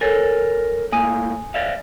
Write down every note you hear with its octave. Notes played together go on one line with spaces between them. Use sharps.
A4 A#4 C#5 G#5 A6
A2 A#3 G#5 D#6 D#7
D5 E5 F5